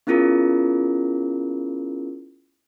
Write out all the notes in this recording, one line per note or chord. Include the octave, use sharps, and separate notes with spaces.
B3 C#4 E4 F4 G#4 A#4